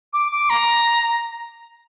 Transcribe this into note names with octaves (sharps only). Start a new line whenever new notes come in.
D6
D6
A#5